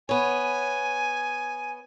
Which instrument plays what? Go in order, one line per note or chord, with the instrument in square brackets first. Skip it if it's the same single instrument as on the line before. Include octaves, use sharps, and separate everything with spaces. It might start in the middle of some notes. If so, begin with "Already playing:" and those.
[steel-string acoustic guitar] B3 C#5 [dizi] G#5